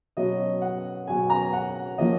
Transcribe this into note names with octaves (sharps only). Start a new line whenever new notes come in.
B2 F#3 C#4 D#5
F#5
B2 F#3 C#4 G#5
A#5
F#5
F3 A#3 C#4 D#5